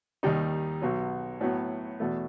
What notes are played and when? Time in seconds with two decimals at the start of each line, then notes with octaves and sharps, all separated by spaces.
0.23 D#2 D#3 G3 D#4
0.82 B1 B2 F#3
1.41 A2 F#3 B3
2.00 E2 B2 A3 E4